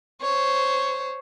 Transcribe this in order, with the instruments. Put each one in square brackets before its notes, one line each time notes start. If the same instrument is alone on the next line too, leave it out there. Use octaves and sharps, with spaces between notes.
[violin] C5 C#5